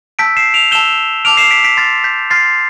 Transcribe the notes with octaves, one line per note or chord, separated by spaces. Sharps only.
A5 E6 G6 B6 D7
C7 E7
D7 F7
A5 E6 G6 E7 G7
A5 D6 F6 D7 F7
C7 E7
B6 D7
B6 D7
C6 F6 A6
G6 B6
C6 F6 A6 C7